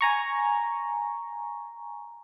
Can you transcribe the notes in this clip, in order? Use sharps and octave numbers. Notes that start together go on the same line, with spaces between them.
G#5 A#5 C#6